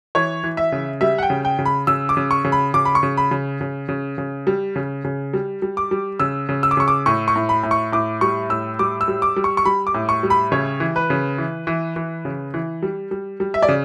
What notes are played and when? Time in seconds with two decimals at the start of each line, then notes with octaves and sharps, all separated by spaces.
0.15 E3 C#5
0.44 E3
0.57 E5
0.72 C#3
1.01 G3 E5
1.18 F#5
1.23 G5
1.30 C#3
1.45 G5
1.59 C#3
1.65 B5
1.87 C#3 E6
2.09 D6
2.17 C#3
2.31 C#6
2.45 C#3
2.52 B5
2.74 C#3 D6
2.85 B5
2.95 C#6
3.03 C#3
3.17 B5
3.31 C#3
3.61 C#3
3.89 C#3
4.18 C#3
4.47 G3
4.76 C#3
5.04 C#3
5.33 G3
5.62 G3
5.77 D6
5.91 G3
6.19 C#3 E6
6.49 C#3
6.63 E6
6.71 D6
6.77 C#3 C#6
6.88 D6
7.06 A2 C#6
7.28 C#6
7.36 A2
7.49 B5
7.63 A2
7.71 C#6
7.92 A2 D6
8.21 G3 C#6
8.50 A2 E6
8.79 G3 D6
9.01 E6
9.08 G3
9.22 D6
9.36 G3
9.44 C#6
9.57 C#6
9.65 G3 B5
9.87 D6
9.94 A2
10.09 C#6
10.23 G3
10.30 B5
10.52 C#3 C#5
10.80 E3
10.96 B4
11.10 C#3
11.38 E3
11.67 E3
11.96 E3
12.25 C#3
12.54 E3
12.82 G3
13.11 G3
13.40 G3
13.54 E5
13.63 D5
13.68 C#3